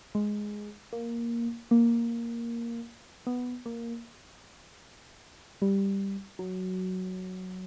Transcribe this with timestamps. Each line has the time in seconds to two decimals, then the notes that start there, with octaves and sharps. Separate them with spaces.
0.15 G#3
0.93 A#3
1.71 A#3
3.27 B3
3.66 A#3
5.62 G3
6.39 F#3